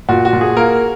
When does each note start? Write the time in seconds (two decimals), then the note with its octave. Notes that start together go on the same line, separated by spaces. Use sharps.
0.09 A#2 F#4
0.25 F#4
0.33 A#2
0.41 G#4
0.57 A#3 A#4